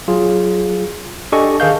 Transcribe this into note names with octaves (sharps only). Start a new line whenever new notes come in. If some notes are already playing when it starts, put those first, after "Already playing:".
F#3 F4 G#4
D4 G4 A4 D#5 G#5 C#6
D#3 G#4 A#4 F5 G6